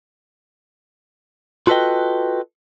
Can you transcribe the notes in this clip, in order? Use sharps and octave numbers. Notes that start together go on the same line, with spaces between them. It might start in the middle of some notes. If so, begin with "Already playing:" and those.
F4 F#4 A4 B4 D#5 G5